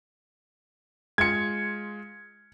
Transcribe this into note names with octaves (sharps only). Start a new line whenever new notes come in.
G#3 F4 G#6 C#7